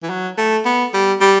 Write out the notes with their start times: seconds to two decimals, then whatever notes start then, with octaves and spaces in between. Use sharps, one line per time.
0.03 E3
0.10 F#3
0.38 A3
0.65 B3
0.94 G3
1.21 G3